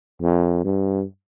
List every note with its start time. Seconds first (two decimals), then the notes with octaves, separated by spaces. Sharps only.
0.22 F2
0.65 G2